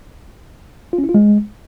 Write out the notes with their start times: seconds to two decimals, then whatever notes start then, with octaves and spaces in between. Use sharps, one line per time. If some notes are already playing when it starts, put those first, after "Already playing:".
0.93 F4
0.98 C#4
1.04 E4
1.09 F4
1.14 G#3